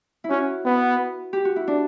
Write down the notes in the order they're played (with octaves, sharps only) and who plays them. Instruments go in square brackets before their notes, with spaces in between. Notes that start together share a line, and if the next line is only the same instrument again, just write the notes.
[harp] E4
[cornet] C#4 [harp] F#4
[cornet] B3
[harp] G4
F#4
E4
D4